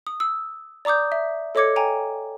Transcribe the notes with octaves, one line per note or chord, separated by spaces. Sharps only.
D#6
E6
D5 A#5 D6 D#6 G6
E5
A4 C#5 D#5 D6 G#6 C#7
G5 G#5 A#5